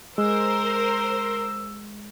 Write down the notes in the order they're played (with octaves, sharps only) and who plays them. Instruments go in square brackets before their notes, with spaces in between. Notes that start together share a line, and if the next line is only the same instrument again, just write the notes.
[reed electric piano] G#3 [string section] A#4 C5 [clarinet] E6